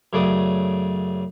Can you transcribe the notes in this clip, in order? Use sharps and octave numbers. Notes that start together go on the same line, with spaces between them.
F#2 C#3 A3 D5 D6 D#6